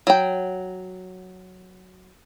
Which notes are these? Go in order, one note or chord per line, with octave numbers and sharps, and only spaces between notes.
F#3 G5